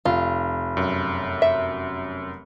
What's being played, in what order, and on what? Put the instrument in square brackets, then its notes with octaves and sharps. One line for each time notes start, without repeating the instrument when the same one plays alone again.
[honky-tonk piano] F1 [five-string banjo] F4
[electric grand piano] F#2
[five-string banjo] E5